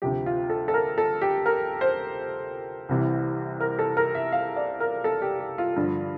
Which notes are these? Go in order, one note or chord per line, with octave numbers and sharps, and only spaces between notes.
D2 C3 F3 G4
F4
A4
A4
A#4
A4
G4
A#4
C5
C2 C3 E3
A#4
A4
A#4
E5
F5
D5
A#4
A4
G4
G4
F4
G2 D3 F3